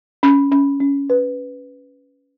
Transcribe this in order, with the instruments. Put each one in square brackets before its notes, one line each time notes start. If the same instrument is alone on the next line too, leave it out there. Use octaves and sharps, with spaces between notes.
[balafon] C#4
C#4
C#4
B4